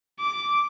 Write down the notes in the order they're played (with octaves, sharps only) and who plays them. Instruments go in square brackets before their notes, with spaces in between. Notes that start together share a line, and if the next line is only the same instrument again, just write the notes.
[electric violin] D6